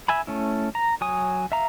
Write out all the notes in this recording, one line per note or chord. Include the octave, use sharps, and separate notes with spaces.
E5 G#5 B5
A3 C#4 E4
A#5
F#3 C#5 G#5 D#6
E5 F5 A#5